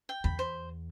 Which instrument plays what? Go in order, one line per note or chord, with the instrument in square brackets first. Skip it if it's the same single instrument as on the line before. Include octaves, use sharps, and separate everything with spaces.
[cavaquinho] G5
[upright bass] E2 [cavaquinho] B5
[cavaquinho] C5